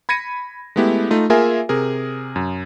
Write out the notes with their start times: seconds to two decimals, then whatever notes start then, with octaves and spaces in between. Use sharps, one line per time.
0.09 B5 G#6 A#6 C#7 D#7
0.76 G#3 A3 B3 E4 G4
1.10 A3 D#4 F4
1.30 A#3 F4 G#4 A#4 E5 G#5
1.69 C3 G#4 A#4
2.36 F#2